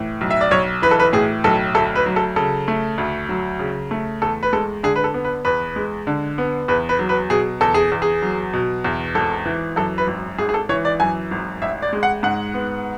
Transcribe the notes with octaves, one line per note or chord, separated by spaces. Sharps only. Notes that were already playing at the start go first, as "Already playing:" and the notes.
Already playing: A2 E3
B1
E5
D5
B1 C#5
E3 B4
A4
B4
A2 G#4
B1 A4
D2 A4
B4
F#3
A4
C#3 A4
A3
D2
F#3
C#3
A3
E2 A4
B4
G#3 A4
D3 G#4
B4
A4
B3
B4
E2 B4
G#3
D3
B3
E2 B4
B4
F#3
B4
B2 G#4
E2 A4
G#4
E2
G#4
F#3
B2
E2
G#1 A4
E3
F#2 A4
B4
G#1
G#1 G#4
G#4
A4
E3 C#5
D5
F#2 G#5
G#1
A1 E5
D5
G#3
F#5
G#2 F#5
B3